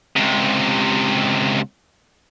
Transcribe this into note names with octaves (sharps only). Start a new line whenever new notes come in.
C#2 C3